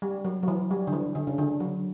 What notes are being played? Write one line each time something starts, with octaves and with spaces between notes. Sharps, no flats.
G3
F#3
F#3
E3
G3
D3
E3
D3
C#3
D3
F#3